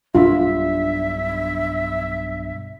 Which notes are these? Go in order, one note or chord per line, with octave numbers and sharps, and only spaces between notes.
B1 G2 D4 F4 E5